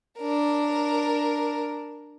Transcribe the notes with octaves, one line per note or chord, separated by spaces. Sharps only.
D4 A#4